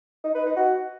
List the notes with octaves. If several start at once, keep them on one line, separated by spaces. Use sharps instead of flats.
D#4
B4
D#4
F#4